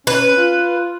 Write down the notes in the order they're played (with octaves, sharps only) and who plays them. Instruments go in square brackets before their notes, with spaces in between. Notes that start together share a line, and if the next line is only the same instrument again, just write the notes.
[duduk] C#4 [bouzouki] B4
[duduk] F4